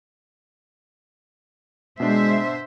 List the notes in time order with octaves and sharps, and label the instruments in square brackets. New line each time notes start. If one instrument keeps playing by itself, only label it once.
[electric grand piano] B2 D4 [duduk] G#3 [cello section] C5 E5